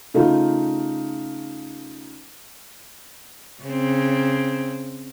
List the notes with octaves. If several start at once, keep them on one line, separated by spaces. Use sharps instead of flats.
C#3 A3 D#4 F4
C#3 C4